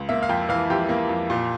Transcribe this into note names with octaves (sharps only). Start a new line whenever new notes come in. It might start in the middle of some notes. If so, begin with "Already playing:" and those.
Already playing: C#2
A#3 E5
F5
F2 G5
E3 F5
F2 G4
A#3
F2
A#2